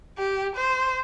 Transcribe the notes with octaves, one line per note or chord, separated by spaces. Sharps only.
G4
C5